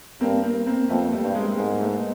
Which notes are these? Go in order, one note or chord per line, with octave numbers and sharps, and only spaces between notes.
G2 A#3 C4
A#3 C4
A#3 C4
F2 A3 B3
G3 A3
G2
G#3 A#3
G#2 G#3 A#3
A#3
A3 B3